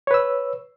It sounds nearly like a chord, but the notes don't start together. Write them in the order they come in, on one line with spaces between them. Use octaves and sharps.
C#5 B4 E6